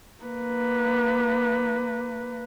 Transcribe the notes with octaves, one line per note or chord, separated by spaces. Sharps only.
A#3 B4